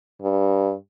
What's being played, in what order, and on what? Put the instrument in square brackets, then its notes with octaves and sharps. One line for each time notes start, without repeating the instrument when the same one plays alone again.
[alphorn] G2